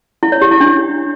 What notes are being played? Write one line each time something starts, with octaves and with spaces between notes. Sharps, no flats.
E4
C#5
G4
E4
D4